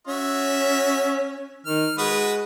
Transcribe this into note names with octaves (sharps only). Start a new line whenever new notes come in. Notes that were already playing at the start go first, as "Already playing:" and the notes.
C#4 F#4 E5
D#3 F6
G#3 F#4 B4 D#6